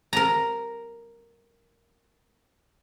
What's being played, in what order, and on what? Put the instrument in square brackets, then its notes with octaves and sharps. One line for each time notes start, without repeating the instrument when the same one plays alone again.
[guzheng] A#4 A#5